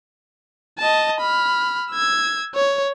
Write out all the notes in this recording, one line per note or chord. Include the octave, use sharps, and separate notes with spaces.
D#5 A5
B5 F6
E6 G#6
C#5